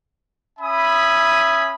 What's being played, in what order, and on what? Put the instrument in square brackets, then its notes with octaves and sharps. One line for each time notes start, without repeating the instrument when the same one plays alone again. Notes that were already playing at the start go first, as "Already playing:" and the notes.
[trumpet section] C#4 E5 G#5 B5 D#6